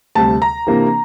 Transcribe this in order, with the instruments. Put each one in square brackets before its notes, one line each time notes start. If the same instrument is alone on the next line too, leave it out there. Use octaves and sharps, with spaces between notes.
[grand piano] D2 C3 G3 A5
A#5
C3 E3 A#3 D4